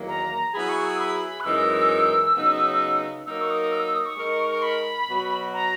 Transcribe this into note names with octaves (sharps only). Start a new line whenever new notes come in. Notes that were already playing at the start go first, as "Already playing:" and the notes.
Already playing: E2 D#3 F#3 A#3
A#5
F#3 B3 E4 G#4 B5
C#6
E6
B5
F#6
F#2 E3 G#3 D#4 A#4 E6
C#3 F#3 B3 D#4
F#3 A#3 D#4 A#4 E6
C#6
D#6
E6
E6
D#6
C#6
G#3 D#4 A#4
C#6
B5
B2 F#3 B3 F#4
A#5